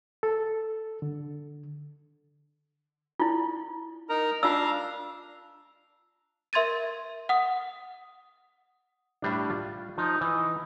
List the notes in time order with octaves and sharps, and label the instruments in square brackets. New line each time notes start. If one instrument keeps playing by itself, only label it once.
[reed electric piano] A4
D3
[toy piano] E4 F4
[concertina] D#4 A#4 A#5
[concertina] D4 F5 A#5 [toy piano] F4 E6
[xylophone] A#4 E5 C6 G#6 A6 D#7
F#5 D#6
[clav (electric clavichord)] A2 G3 D4
F4
[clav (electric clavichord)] F3 [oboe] D#4
[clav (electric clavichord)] E3 [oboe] D#5